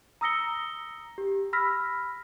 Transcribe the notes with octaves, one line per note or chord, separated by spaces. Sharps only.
A#5 D#6 E6 A#6 C#7 G7
G4
B5 E6 F6 A#6 B6